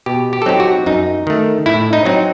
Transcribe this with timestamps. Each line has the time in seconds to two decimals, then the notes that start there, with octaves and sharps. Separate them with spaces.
0.06 B2 G4
0.33 G4
0.42 A4
0.46 F#3 C4 D#4 G4
0.60 F#4
0.86 F#2 D#4
1.27 D#3 A3
1.66 A2 E4
1.93 D#4
2.05 F#3 C4 D#4